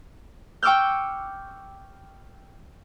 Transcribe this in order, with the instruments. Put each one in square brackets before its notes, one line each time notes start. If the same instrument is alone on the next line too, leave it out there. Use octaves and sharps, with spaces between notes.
[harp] G5 C#6 D6 E6 F6 G6